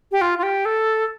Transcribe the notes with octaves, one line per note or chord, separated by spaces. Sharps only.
G4
F4
F4
G4
A4